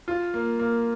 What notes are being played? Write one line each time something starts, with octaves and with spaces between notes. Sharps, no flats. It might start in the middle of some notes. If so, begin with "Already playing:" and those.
F4
A#3
A#3